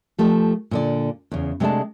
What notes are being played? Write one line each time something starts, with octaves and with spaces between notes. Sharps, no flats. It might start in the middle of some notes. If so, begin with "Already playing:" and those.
F3 A3 G4
A#2 D3 D5
E2 C#3
C3 G#3 A3 D4 D5 A5